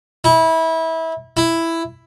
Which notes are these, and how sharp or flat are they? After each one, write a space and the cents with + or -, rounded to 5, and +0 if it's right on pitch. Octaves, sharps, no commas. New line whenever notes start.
E4 -25
E4 +5